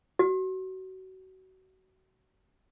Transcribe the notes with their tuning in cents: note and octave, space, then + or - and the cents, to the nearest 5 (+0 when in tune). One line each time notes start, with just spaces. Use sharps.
F#4 +25